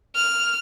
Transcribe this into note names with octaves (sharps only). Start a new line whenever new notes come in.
F6